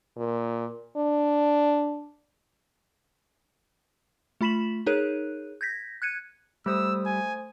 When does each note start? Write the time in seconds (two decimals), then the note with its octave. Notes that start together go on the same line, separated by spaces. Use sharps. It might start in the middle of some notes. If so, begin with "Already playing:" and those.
0.17 A#2
0.97 D4
4.41 A3 F4 B5 B6 E7 F#7
4.86 D#4 G#4 A#4 C#5 F#6 D#7
5.61 G6 G#6 A#6 B6
6.02 F#6 G#6 C#7 D#7
6.66 G3 A3 C5 D#6 E6
7.06 G#5